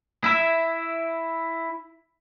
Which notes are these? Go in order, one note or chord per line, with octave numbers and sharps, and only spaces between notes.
E4 E5